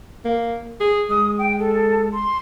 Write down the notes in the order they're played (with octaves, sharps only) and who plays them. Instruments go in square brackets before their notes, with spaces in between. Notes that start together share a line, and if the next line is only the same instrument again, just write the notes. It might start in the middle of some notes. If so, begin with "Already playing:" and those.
[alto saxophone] A#3
G#4
[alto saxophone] G#3 [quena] D#6
[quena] G5
A4
C6